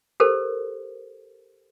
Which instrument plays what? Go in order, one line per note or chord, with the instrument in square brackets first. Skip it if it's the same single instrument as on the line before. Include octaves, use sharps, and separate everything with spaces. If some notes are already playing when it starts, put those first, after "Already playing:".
[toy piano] G4 A4 A#4 C5